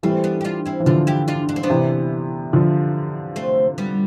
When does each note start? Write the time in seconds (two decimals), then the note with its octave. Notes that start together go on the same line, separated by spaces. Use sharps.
0.03 E3 G3 A3 C4
0.24 B3 D4
0.41 G4
0.44 D4 F4
0.66 C4 E4
0.80 E3
0.86 D3 F3 D4 F4
1.07 E4 G4
1.28 D4 F4
1.49 D4
1.56 C4
1.63 B3 D4
1.70 C3 E3
2.53 D3 F3
3.36 A3 C4
3.78 G3 B3